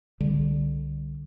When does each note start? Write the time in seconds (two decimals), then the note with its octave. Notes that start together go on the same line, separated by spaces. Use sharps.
0.20 C2 D3 G3